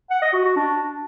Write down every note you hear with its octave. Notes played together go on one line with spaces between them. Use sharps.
F#5
D#5
F#4
F#4
D4